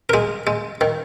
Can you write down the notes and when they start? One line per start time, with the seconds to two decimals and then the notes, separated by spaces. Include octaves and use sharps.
0.09 A#4
0.14 G#3 G#4
0.47 G#3
0.81 D#3